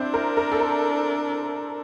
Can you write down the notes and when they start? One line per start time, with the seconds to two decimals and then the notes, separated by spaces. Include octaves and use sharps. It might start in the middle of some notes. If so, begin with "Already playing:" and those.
Already playing: C4 D4 E4 C5
0.14 A#4
0.37 A#4
0.52 A4
0.60 A#4